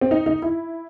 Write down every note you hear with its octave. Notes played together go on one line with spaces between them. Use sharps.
C4
D#4
D#4
E4